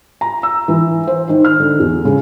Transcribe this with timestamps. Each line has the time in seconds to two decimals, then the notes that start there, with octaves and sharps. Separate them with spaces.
0.21 A#5
0.43 E6
0.68 E3
1.07 C5
1.29 D#3
1.45 F6
1.60 D3
1.80 E2
2.05 C#3